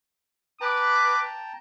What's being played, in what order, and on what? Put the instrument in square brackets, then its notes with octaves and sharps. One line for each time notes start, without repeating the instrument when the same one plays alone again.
[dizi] B4 [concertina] G5 A5 A#5 [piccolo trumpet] D6